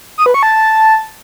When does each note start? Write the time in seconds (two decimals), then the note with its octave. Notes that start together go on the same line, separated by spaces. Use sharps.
0.18 D#6
0.26 B4
0.34 C#6
0.43 A5